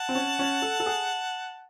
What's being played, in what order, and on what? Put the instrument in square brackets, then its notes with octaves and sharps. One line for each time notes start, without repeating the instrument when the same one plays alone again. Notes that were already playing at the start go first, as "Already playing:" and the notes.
Already playing: [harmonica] F#5 A5
[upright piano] C4
C#4
C#4
A4
A4
G#4